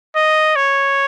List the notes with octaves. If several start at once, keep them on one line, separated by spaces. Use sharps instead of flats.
D#5
C#5